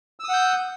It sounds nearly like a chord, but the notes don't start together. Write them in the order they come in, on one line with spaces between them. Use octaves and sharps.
E6 D#6 F#5 G6